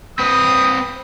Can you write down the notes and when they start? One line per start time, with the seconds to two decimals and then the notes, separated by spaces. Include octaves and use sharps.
0.19 C4 B4 D#6